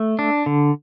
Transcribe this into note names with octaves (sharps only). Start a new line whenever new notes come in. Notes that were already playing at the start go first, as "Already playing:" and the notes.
Already playing: A3
D4
D3